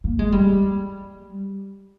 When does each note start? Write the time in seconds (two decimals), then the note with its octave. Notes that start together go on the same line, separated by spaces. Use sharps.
0.04 A#3
0.19 G#3
0.32 G3